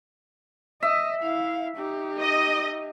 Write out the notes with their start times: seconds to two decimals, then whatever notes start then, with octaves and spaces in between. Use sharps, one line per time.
0.83 D#5 E5
1.21 E4 F5
1.76 D#4 G4
2.19 D#5